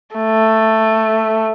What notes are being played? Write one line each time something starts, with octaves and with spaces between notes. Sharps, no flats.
A3